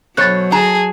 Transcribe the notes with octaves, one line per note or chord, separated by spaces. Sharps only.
B2 F#3 C5 C#5 F#6 A6
G#4 A5 A#5